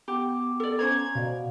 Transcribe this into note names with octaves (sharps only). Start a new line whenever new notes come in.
B3 G4 F#5 D6
A4 D5
C#4 C5 A#5 G#6
B2 D5 F5